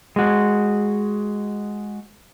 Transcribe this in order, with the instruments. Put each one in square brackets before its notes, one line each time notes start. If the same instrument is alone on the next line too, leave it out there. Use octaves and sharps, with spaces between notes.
[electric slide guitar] G#3 F#4